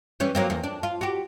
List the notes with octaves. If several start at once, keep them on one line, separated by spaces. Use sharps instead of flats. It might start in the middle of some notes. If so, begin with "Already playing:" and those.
E3 G3 C#4
F#3 A#3 C4
E2 A#3
D4
F4
F#4 G4